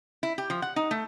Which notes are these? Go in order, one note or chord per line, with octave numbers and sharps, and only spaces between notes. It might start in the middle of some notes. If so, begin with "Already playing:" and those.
E4
G4
F3
F#5
D#4
A3